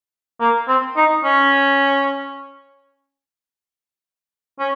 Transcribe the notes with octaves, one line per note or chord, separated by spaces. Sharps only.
A#3
C4
D#4
C#4
C#4